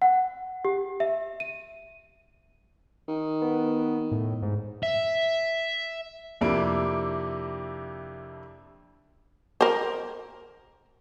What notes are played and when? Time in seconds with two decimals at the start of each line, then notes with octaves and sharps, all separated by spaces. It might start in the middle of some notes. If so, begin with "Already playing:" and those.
0.02 F#5
0.65 G4
1.00 E5
1.40 D#7
3.08 D#3
3.42 B3
4.11 A2
4.42 G#2
4.83 E5
6.41 F2 C3 A#3 D4 E4 D7
9.61 A#4 C5